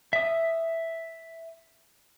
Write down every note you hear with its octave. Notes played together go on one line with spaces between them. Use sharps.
E5 D#6